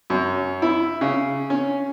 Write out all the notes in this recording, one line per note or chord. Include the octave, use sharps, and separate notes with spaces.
F#2
E4
C#3
C#4